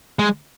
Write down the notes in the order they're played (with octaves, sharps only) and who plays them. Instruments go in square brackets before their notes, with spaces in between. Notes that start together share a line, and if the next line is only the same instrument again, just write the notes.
[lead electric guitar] G#3